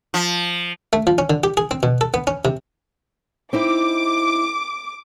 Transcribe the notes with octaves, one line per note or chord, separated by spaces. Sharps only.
F3
A3
F3
C#4
D3
G4
G#4
C4
B2
A4
B3
C#4
C3
C4 D#4 E4 D6